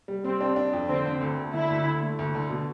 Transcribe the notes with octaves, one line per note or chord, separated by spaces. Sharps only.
G3
G3 C4
D4
D4
F2
D3 C4
D3
D2
D2
D3 E4
D2
D3
A3
D2
D3
B2